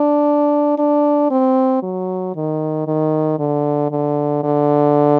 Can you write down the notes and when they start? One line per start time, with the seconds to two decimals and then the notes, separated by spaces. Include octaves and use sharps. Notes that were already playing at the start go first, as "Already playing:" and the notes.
Already playing: D4
0.78 D4
1.31 C4
1.83 F#3
2.36 D#3
2.87 D#3
3.39 D3
3.91 D3
4.44 D3